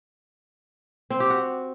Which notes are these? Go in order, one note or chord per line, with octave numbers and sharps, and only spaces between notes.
C4
G4
F#4